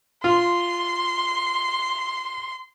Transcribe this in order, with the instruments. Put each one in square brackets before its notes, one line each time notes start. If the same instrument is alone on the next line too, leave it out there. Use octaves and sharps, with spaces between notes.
[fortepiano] F4 [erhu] C6